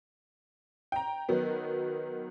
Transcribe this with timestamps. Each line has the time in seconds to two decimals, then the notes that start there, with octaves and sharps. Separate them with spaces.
0.92 G5 A#5
1.29 D#3 F#3 B3